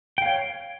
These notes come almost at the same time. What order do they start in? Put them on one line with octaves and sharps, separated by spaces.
G5 F5 C#5